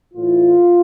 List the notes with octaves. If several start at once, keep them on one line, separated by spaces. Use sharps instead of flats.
A2 E3 F4